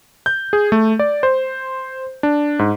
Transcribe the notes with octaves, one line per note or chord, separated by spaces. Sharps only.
G6
G#4
A3
D5
C5
D4
G#2